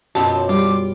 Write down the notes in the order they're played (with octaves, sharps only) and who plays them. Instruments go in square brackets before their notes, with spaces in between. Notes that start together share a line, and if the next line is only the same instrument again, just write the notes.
[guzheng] F#2 B2 F3 [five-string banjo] C4 A5 [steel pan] F#4
[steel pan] G3 [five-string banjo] F4 [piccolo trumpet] D6